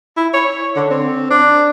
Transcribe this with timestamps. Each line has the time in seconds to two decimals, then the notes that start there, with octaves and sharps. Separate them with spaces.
0.17 E4
0.33 C#5
0.75 D3
0.91 C4
1.30 D4